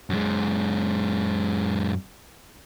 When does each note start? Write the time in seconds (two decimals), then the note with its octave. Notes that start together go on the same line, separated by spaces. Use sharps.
0.10 F#2 G#3